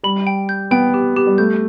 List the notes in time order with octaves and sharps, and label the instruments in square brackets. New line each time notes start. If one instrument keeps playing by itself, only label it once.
[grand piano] G3 [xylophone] B5
[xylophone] G5
G6
[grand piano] B3 [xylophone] G5
[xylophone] G4
G4
[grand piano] G3
[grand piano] A3 [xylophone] G6